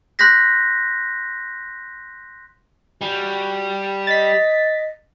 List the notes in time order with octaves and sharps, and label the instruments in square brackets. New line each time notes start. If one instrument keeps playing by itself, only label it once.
[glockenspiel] C6 F#6 G6 A#6 B6
[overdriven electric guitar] G3 [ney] F#4
[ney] D#5 [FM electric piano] A6 B6